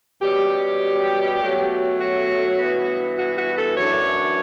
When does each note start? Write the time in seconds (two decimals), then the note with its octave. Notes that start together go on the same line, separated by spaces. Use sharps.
0.22 B2 G3 C#4 G4
1.40 B2 F#3 A3 C#4
1.99 F#4
2.58 G2 E3 B3
3.18 F#4
3.37 F#4
3.57 A4
3.77 F#2 E3 A3 D4 C#5